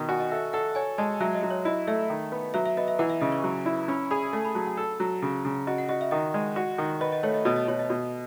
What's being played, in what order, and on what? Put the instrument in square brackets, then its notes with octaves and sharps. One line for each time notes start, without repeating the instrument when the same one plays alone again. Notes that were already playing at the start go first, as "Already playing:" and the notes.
Already playing: [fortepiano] B2 D#3 [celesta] D#5
[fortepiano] F#4 [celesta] G#5
[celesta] D#5
[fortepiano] A4 [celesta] E5
[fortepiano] A4 [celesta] F#5
[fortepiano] C#5 [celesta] G#5
[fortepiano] G#3 [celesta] A5
[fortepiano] F#3 [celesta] E5
[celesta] D#5
[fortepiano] F#3
[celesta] C#5
[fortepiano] E4 [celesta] D#5
[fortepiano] A3 [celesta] E5
[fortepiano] D#3
B3
[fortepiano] F#3 [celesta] E5
[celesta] E5
[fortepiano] B3 [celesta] D#5
[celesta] E5
[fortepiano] E3 [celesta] F#5
[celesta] E5
[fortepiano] C#3 [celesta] D#5
[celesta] C#6
[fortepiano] F#3
E4
[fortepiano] C#4 [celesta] B5
[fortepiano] G#4 [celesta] B5
[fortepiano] A3 [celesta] A5
[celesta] B5
[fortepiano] F#3 [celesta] A5
[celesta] F#5
[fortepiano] A4
F#3
C#3
C#3
[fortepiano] F#4 [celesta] D#5
[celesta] F#5
[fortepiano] F#4 [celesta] D#5
[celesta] E5
[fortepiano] D#3 [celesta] D#5
[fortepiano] G#3
F#4
D#3
[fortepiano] B4 [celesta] D#5
[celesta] D#5
[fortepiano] A3 [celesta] C#5
[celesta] D#5
[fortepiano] B2 [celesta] D#5
[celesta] D#5
[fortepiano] B2 [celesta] C#5
[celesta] D#5
[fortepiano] B2